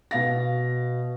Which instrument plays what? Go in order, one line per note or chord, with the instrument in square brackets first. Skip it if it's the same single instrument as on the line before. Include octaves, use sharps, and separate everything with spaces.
[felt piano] B2 F5 A#6